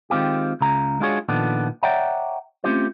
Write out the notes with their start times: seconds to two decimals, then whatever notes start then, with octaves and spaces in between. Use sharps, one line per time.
0.10 D#3 G#3 C4 F4 G4
0.61 C#2 C#3 A#5
1.00 G#3 D4 F4 F#4 G#4 C#5
1.29 A#2 D#3 F3 B3 D4 A4
1.83 C#5 D5 E5 F#5 G5 A#5
2.64 A3 C4 C#4 F4 G4 C5